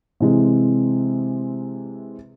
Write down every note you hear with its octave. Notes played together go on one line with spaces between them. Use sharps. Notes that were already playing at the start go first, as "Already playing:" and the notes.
C3 E3 G#3 C4